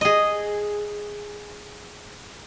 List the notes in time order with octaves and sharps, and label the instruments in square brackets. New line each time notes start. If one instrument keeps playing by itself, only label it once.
[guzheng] G#4 D#5